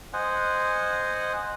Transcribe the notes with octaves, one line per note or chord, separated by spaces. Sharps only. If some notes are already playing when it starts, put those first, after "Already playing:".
C5 D#5 F#5 G#5